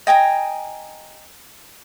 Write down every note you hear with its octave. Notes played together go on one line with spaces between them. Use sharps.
D#5 G5 G#5 A#5